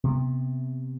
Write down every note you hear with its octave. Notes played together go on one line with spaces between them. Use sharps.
C3 B3